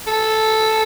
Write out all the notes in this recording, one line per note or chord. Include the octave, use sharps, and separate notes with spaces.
A4